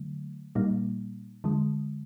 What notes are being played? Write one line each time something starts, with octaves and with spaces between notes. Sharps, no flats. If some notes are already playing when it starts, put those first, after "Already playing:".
Already playing: D3 F#3 A3
A#2 G3 A#3 D#4
D3 F3 G#3